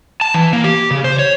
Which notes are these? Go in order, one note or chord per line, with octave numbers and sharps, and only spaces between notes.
A5
E3
A#3
G4
C#3
C5
C#5